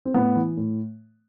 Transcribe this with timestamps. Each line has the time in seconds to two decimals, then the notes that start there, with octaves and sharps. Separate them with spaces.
0.05 C4
0.14 A2 B3
0.35 E3
0.57 A2